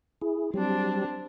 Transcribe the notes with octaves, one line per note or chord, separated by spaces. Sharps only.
E4 G#4
F#3 G3 C4 D4 G4